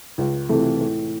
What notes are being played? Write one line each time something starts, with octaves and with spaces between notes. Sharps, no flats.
C#2
C3 E3 A3
A2